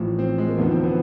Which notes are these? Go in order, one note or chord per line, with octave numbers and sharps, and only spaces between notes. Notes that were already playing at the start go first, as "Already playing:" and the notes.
Already playing: A1 A2 F3
C4
G#3
A#3
E1 D#2 D3 F3 B3
C4
B3